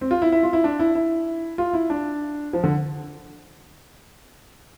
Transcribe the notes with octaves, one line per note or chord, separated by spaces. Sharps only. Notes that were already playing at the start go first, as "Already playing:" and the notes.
C4
F4
E4
E4
F4
E4
D4
E4
E4
F4
E4
D4
F3
D3